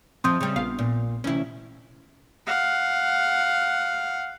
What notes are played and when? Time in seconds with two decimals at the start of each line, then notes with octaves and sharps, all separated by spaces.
0.24 F2 F3 C4 C6 D#6 G6
0.41 C#3 G3
0.56 A#1 B3 F5
0.79 A#2
1.24 D2 C3 E3 C#4 E4
2.47 F5 F#5